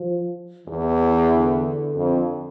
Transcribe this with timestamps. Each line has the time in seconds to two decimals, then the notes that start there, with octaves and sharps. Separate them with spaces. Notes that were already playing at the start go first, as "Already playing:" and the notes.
Already playing: F3
0.68 E2 E3
1.32 D3
1.96 F2